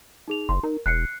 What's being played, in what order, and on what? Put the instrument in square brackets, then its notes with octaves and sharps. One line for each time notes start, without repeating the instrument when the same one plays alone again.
[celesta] D#4 G#4 F7
[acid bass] F#1 [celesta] C6
[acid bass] D#4 [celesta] A#4
[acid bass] E1 [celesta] F#6 C7 C#7